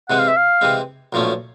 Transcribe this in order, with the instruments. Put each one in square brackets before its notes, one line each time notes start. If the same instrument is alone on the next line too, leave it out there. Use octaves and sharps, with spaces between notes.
[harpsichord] C3 E3 G#3 C4 [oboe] F#5
[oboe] F5
E5
F5
[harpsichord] C3 E3 G#3 C4
B1 A#2 F3 A3 C#4